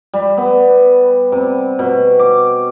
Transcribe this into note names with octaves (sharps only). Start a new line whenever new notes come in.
G3
B3
C3
B2
D6